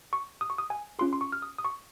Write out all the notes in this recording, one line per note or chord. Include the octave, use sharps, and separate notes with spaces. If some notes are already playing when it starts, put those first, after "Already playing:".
C#6
D#6
C#6
D#6
G#5
C#4 F4 G#4 C6
C6
C#6
F6
D#6
D#6
C#6